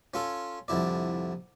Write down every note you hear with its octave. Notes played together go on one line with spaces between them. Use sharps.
C#4 F4 A4
C2 F2 D3 E4 D5